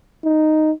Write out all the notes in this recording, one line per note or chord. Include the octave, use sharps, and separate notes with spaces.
D#4